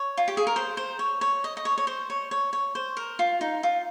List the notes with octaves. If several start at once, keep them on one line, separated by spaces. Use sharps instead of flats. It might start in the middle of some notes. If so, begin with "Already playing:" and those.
Already playing: C#5
F4
G4
G#4
A#4
C5
C5
C#5
C#5
D#5
D#5
C#5
C#5
C5
C#5
C#5
C#5
C5
A#4
F4
D#4
F4